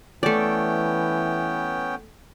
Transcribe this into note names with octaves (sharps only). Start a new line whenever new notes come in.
E3 A3 B3 C#4 D5 G5